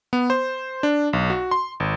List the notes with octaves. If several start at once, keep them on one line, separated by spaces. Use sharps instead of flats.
B3
C5
D4
B1
F#4
C6
G#1